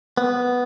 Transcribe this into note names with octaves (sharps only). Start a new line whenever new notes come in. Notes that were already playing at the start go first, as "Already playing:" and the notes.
B3